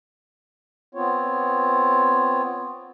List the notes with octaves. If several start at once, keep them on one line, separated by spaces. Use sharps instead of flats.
B3 C4 F4 C#5